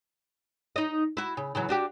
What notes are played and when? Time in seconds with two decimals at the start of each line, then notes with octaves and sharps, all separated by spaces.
0.76 D#4 D#5
1.17 E4 F#4
1.37 C#3
1.55 C#3 E3 F#3
1.69 D4 F#4 G4